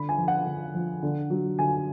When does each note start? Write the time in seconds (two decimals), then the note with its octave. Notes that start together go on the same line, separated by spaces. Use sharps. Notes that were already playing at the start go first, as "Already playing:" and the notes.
Already playing: D3 B5
0.09 G#5
0.18 F3
0.28 F#5
0.46 D3
0.74 F3
1.03 D3
1.30 F#3
1.59 D3 G#5